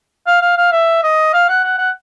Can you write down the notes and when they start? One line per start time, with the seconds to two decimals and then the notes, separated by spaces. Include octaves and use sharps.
0.27 F5
0.41 F5
0.57 F5
0.72 E5
1.03 D#5
1.33 F5
1.49 F#5
1.64 F#5
1.78 F#5